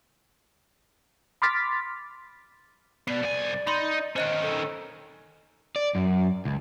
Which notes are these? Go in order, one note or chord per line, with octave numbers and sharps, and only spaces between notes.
B5 C6 D6 F6 A6 B6
B2 B3 D5 C7
C2 G#5
D#4 B5 C6
D#3 C#4 C5 D#5 F#6
A4
D5
F#2
C#2